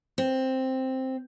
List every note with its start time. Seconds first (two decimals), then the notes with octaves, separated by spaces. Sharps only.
0.18 C4